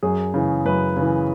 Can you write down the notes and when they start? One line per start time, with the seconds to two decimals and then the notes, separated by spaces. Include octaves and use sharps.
0.03 F#2 G#4
0.34 C#3 E3
0.65 F#2 B4
0.97 C#3 E3